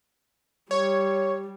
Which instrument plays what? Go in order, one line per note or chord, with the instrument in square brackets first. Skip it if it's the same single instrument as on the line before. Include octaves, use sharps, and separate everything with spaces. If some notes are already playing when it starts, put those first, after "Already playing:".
[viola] G3 [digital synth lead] C#5